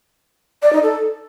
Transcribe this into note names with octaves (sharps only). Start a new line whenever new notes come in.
D5
D#4
A4